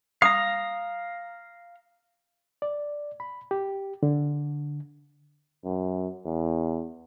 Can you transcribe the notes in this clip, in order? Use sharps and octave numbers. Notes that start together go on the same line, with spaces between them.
F5 A#5 D#6
D5
B5
G4
D3
F#2
E2